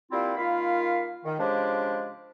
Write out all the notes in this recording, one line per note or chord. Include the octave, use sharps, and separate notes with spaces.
G3 A#3 C4 E4 F4
D#3 A#3 F4 F5 B5
D#3
C#3 F3 G#3 D4 G4 C5